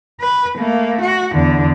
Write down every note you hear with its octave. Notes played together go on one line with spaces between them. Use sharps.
B4
A3 A#3
F#4
E2 D3